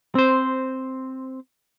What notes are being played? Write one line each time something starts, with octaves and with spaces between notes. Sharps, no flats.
C4 C5